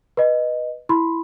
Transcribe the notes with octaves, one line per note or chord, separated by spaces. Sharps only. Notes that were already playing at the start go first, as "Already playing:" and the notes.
B4 D#5
E4 B5 C6